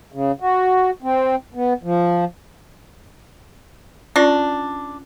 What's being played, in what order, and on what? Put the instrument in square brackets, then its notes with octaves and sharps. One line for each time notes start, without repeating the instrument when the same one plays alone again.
[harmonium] C#3
F#4
C4
B3
F3
[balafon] C#4 F4 D5 [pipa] D4